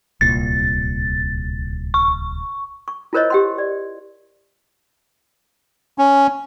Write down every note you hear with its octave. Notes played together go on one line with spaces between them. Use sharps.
D1 C2 A#2 A6
C#6
C#6
E4 F4 A#4 C5 C#5 D#5
G4 F#5 C6
D5
C#4